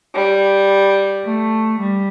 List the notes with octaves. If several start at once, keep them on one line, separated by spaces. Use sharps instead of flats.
G3
A3
G3